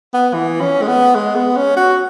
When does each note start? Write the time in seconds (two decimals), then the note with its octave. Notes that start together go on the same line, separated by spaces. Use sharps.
0.14 B3
0.34 E3
0.61 C#4
0.82 G#3
0.88 B3
1.15 G#3
1.36 B3
1.56 C#4
1.77 F#4